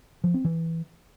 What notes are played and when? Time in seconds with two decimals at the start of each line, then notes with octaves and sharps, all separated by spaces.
0.24 F3
0.34 C4
0.45 E3